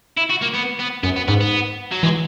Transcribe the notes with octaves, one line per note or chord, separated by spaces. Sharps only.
E4
F#4
A#3
B3
B3
F#2 B3
B3
G#2 B3
B3
F#3
E3 G#3